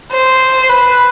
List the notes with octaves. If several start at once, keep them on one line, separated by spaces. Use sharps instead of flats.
C5
B4